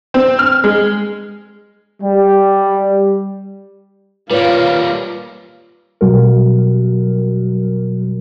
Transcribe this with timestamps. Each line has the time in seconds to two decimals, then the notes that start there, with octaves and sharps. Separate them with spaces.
0.14 C4
0.39 F6
0.64 G#3
2.02 G3
4.30 G3 A#3 F4 B4 C#5 F5
6.01 B2 F#3 G3 F#4 A#4